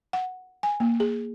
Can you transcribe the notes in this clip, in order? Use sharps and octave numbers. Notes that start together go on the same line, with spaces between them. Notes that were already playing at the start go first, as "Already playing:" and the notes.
F#5
G#5
A#3
G#4